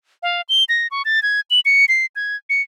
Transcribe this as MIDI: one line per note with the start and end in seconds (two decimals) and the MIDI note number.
0.23 0.41 77
0.49 0.64 103
0.69 0.87 94
0.91 1.02 85
1.05 1.22 93
1.23 1.41 92
1.51 1.60 102
1.65 1.85 97
1.89 2.06 96
2.16 2.36 92
2.50 2.62 97